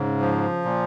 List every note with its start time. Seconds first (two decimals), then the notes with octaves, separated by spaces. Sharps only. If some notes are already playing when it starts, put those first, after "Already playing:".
Already playing: G#2 C#3
0.20 F3
0.65 A#2